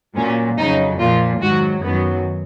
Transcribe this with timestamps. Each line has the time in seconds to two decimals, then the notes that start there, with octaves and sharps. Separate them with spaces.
0.16 A#2 F#3 C#4
0.58 F2 C#3 F#3 D#4
0.99 A#2 F3 F4
1.41 G#2 D#3 F#3 F#4
1.82 F#2 D#3 F#3 B3